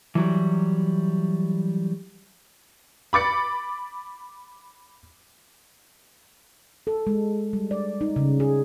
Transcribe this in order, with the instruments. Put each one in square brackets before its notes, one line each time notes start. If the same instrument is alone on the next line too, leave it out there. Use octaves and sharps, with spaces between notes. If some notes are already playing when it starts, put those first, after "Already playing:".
[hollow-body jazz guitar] E3 F#3 G3
[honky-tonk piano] B5 D6 A6 C#7
[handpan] A4
G#3
G3
D5
D#4
C#3
G#4